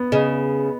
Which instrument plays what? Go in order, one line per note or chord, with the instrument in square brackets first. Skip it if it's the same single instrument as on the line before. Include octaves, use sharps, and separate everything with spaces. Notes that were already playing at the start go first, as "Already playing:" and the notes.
Already playing: [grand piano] B3
[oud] C#3 [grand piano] D#5